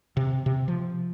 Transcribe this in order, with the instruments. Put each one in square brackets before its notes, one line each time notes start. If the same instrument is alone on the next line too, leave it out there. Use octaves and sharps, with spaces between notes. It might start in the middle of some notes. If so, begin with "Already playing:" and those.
[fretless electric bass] C3
C3
F3